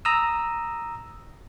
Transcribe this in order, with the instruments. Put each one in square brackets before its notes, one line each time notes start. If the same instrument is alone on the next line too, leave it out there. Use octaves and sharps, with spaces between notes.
[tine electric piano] A#5 D#6 E6